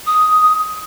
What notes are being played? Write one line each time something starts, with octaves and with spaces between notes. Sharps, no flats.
D#6